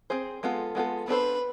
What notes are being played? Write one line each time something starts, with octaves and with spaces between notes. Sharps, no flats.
C4 G#4 C5
G#3 B3 F4 A4
G#3 B3 F4 A4
B3 D4 A4 B4 C5